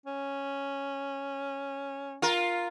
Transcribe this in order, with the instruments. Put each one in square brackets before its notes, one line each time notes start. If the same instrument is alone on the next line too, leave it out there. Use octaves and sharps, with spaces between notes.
[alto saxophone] C#4
[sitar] F4 A#4